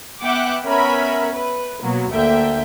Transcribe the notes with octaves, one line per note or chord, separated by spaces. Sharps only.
B3 E5 F#5 G5 D6 F#6
B3 C#4 A#4 E5 B5
B4
B2 F#3 A#3 B3
D2 D3 A#3 E5 G5